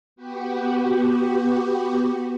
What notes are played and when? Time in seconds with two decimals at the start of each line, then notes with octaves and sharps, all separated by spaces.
0.16 B3 F#4 G4